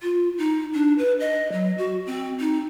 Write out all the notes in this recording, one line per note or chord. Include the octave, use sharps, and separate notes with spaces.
F4
D#4
D4
B4
D#5
F#3
F#4
C4
D#4